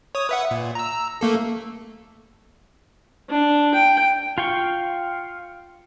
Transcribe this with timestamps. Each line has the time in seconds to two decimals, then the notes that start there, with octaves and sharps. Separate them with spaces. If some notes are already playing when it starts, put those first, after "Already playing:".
0.15 C#5 D#6
0.29 B4 E5 F#5
0.51 A#2
0.75 A#5 E6
1.21 A3 A#3 A4
3.30 D4
3.74 G5
4.38 F4 F5 G5 C#6